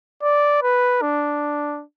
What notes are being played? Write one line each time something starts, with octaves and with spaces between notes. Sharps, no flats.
D5
B4
D4